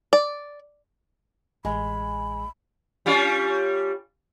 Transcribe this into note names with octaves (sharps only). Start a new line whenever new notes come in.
D5
A1 G#3 G#5 B5
G3 C#4 F4